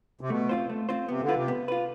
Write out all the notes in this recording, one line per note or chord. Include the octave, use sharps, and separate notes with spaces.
C3
B2 A3
C4 F4 C5
A3
C4 F4 C5
C3 B3
D3
F4 B4
C3
B3
F4 B4